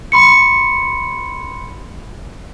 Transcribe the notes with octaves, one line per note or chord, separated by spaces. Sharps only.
B5 C6 C#7